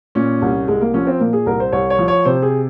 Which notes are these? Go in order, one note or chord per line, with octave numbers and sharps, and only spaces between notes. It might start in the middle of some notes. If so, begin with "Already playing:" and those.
A#2 C#4
C2
C2 G#3
A#3
F3 C#4
C4
A#2 A#3
G#4
C2 A#4
C5
C2 C#5
C#5
F3
C#5
C3 C5
G#4